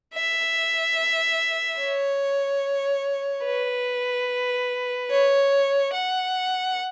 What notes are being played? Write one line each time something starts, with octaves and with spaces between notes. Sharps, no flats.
E5
C#5
B4
C#5
F#5